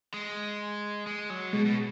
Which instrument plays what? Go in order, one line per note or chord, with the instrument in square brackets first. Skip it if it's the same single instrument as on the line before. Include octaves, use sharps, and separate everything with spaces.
[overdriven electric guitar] G#3
G#3
F#3
[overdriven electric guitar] B2 [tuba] G#3
[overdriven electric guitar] B2